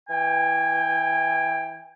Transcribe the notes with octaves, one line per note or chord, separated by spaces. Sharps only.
E3 G5 G#5